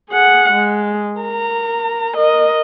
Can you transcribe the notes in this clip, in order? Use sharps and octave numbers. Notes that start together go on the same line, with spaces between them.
G#4 F#5
G#3
A#4 A#5
A#4 D#5